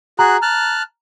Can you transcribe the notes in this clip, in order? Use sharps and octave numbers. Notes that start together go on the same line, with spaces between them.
F#4 G#4 A#5 F#6
A5 F6 F#6